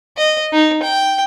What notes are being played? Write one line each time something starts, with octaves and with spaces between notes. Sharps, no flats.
D#5
D#4
G5